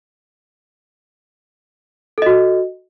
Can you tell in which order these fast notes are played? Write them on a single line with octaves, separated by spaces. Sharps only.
A4 D#5 F#4